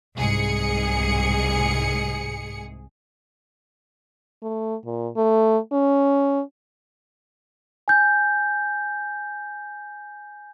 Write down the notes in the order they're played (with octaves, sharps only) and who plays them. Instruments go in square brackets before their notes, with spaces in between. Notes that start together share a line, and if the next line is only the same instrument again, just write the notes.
[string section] C2 G#2 G#4 C#7
[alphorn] A3
A#2
A3
C#4
[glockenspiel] G#5 G6